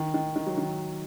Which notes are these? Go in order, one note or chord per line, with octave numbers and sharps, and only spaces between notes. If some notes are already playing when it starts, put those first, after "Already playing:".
Already playing: D#3
D#3
D#3
F#3
D#3